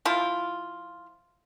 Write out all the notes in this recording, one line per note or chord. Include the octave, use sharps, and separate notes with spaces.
F3 E4 F4